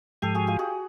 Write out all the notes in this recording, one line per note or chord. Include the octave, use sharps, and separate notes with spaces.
G#2 F3 G#3 G4 A4
F#4 G#4
F4 G4
F#4 G#4